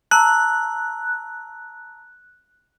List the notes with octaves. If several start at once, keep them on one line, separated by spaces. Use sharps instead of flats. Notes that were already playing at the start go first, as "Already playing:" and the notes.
A5 A#5 E6 F#6